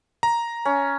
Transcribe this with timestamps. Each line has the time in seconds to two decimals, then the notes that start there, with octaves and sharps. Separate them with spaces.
0.23 A#5
0.65 C#4